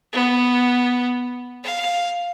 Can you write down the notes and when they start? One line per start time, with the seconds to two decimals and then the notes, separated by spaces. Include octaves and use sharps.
0.13 B3
1.63 F5